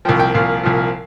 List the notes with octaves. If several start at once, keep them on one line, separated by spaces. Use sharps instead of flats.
C2 A#2 F3 G5
G5
C2 A#2 F3 F5
C2 A#2 F3